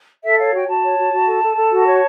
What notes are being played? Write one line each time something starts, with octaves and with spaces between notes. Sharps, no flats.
A4 E5
C#5 F5
F#4 G5
F#4 A5
C#5
F#4
F#4
A4
A4
A4
F#4
C#5